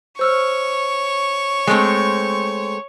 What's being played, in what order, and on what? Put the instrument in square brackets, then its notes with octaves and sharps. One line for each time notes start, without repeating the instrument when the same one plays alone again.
[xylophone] C5 E6 F6 [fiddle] C#5 C#6
[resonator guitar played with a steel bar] G#3 A3 C4